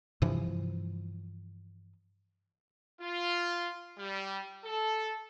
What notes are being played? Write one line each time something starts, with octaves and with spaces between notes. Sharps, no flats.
G2 C3 E3 F3
F4
G3
A4